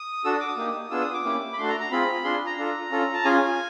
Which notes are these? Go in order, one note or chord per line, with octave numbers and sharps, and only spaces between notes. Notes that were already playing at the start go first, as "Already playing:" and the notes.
Already playing: D#6
D4 F#4 A4 E6
D#6
D6
D#6
A#3 D#4 G4
B3 D4 F4 G#4 E6
D#6
D6
A#3 C#4 E4 G4
B5
A3 D4 F#4 A4 C6
A#5
A#5
C4 F4 G#4 B5
D4 F4 G#4 C6
A#5
D4 F4 A4
C#4 F4 A4
A5
C#4 F4 G#4 G#5